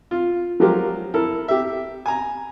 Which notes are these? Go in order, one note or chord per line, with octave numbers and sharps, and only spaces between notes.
F4
F3 F#3 G#3 F4 G4 A#4
E4 A4 A#4
G4 E5
G#5 A#5